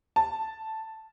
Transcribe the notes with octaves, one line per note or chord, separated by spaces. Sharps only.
A5